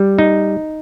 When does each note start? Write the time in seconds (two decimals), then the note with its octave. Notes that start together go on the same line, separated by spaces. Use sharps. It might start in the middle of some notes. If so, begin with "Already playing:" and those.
Already playing: G3
0.19 D#4